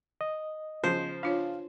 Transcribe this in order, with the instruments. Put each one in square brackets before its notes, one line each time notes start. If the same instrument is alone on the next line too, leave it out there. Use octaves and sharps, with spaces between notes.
[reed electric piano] D#5
[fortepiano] C#3 F3 [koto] C5
[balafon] D4 F4 C#5 [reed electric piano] F5